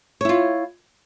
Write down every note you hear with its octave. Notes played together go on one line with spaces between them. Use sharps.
E4 F4 C#5